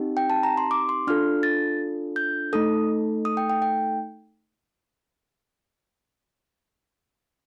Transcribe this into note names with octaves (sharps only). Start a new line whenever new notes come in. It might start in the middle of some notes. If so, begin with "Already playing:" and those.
Already playing: C4 D#4 G4
G5
A5
A#5
C6
D6
C6
D4 F4 A4 F6
A6
G6
A3 D#4 A4 D#6
D#6
G5
G5
G5